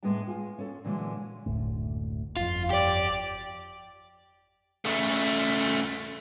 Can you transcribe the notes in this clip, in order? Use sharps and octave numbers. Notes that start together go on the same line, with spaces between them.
A2 G#3 A3 B3 D4 A5
F4 G#4
C#4 A4
A#2 D3 E3 F#3 G#3 A#3
F#1 D2 A2
G1 F2 F4
G4 D5
C#3 A3